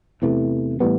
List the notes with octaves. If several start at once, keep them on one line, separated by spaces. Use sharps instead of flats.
E2 C3 E3 A3
A2 E3 G3 B3